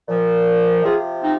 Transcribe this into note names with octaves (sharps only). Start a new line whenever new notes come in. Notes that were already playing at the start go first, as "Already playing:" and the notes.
A#2 F3
C3 F3 F4 G#4
C4 D#4